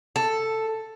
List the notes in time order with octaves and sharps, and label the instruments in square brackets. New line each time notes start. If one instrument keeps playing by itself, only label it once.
[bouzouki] A4